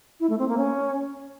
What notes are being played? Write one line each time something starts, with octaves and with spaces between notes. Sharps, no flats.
E4
A3
C4
A#3
C#4